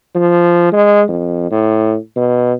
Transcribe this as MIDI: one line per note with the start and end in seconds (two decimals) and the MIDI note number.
0.15 0.72 53
0.73 1.03 56
1.08 1.48 41
1.51 1.96 45
2.16 2.53 47